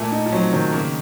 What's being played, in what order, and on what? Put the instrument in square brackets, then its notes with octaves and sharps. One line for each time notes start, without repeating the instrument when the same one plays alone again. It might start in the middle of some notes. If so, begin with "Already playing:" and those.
Already playing: [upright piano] A#2 [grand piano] A3 A#3
[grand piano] D#4
[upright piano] F3
[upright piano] F#3 [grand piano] C4
[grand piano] D#3 [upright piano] F#3
[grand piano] C#3 [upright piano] A#3